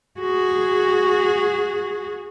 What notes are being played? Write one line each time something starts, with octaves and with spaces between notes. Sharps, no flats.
F#4 G#4